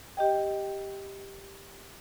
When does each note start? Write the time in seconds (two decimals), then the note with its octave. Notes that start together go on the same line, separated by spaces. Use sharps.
0.17 G4 D#5 G5